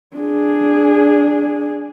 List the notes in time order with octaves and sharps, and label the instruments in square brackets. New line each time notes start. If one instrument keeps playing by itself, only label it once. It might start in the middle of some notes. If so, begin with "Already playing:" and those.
[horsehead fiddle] D4 G#4